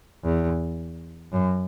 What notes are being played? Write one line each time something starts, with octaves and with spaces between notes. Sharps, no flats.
E2
F#2